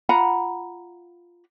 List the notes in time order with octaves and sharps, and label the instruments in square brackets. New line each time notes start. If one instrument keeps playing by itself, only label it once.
[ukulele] F4 F#5 A#5 B5